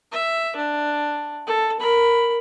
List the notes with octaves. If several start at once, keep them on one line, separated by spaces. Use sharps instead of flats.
E5
D4
A4
A#4 B5